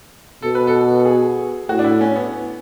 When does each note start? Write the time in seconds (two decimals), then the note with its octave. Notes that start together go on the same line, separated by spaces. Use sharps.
0.42 B2 A4
0.55 B4
0.67 A4
1.06 G#4
1.68 A2 F#4
1.79 D4
1.84 E4
2.01 C#4
2.16 B3